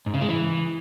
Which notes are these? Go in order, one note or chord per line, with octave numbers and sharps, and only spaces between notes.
G#2
C#3
G#3
E3